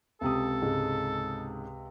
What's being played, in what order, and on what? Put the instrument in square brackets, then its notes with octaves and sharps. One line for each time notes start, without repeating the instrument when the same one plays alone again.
[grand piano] C#2 C3 D#6 [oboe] A4
[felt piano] G#2 C#3